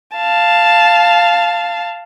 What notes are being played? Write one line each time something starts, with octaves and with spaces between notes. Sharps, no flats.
F5 A5